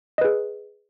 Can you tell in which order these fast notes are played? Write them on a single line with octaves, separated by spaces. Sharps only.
D#5 B4 G#4